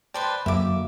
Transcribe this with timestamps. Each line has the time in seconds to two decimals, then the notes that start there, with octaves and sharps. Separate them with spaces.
0.14 B4 C5 D5 G5 A5 B5
0.46 F#2 D3 A#3 F#4 E5 D6